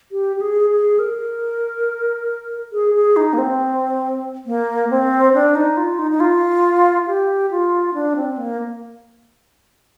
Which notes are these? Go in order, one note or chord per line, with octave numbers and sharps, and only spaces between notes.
G4
G4
G#4
G#4
A#4
G#4
G#4
D#4
A#3
C4
A#3
C4
D4
D#4
F4
D#4
D#4
F4
G4
F4
D4
C4
A#3